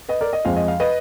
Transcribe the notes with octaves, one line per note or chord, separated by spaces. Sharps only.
B4 D#5
A#4 D5
D#5
F2 F3 G#3 F5
D#5
F5
B4 D#5